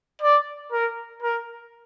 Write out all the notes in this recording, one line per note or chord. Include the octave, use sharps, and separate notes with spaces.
D5
A#4
A#4